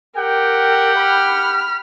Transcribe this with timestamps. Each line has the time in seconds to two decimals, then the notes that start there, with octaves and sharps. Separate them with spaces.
0.17 G4 A#4 F#5 G5
0.98 B5 F6